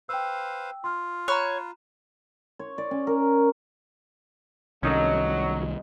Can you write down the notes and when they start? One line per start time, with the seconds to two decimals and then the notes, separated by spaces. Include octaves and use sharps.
0.09 B4 C5 F5 G5 E6
0.84 F4 C6 F6
1.28 C#5 A#5 B5 F#6
2.59 C#5
2.78 D5
2.91 C#4
3.07 A#4
4.83 C2 D#3 F#3 C#4 D#4 A4 D#5